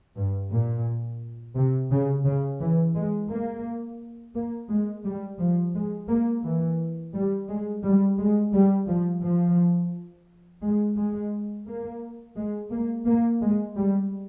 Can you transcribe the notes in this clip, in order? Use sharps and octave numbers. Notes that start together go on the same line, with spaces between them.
G2
A#2
C3
C#3
C#3
E3
G#3
A#3
A#3
G#3
G3
F3
G#3
A#3
E3
G3
G#3
G3
G#3
G3
F3
F3
G#3
G#3
A#3
G#3
A#3
A#3
G#3
G3